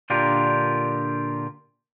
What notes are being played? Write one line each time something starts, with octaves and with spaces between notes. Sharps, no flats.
A#2 D3 D4 F4 G4 A#4